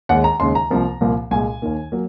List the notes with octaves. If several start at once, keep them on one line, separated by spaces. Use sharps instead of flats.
D#2 D#3 G#3 F#5
A#5
D#2 C#3 G#3 C6
A#5
C2 C3 F3 A#3
C2 A#2 F3 A#3
C2 A#2 G#3 G#5
D#2 D#3 A#3
F#3 A#3